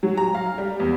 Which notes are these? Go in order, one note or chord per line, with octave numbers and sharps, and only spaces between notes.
F#3
A#5
F5
G3
E2